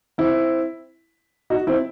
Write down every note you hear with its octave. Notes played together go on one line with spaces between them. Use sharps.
C4 E4
D#4 F#4
C4 E4